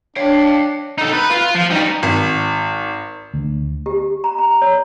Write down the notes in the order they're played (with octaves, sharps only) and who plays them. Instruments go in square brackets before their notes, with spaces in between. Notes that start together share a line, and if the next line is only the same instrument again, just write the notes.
[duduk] D4 [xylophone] C#5 [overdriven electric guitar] F5 G5
[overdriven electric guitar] D#4 A4
B4
F4
F3
G3 D#4
[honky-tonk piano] G#1
[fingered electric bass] D2
[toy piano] G4
A#5
A#5
C#5